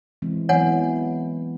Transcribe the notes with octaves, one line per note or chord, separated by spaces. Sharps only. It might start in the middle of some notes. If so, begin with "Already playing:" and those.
E3 G#3 C4
E3 F#3 B3 C#5 F#5 G#5